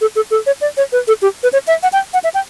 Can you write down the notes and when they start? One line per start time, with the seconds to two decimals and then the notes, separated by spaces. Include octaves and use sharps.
0.01 A4
0.16 A4
0.31 A4
0.46 C#5
0.61 D5
0.77 C#5
0.92 B4
1.08 A4
1.22 G4
1.43 B4
1.53 C#5
1.67 E5
1.83 F#5
1.93 G5
2.14 F#5
2.24 E5
2.34 G5